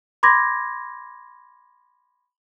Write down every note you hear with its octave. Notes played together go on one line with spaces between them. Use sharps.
B5 C6 D6 G#6 A#6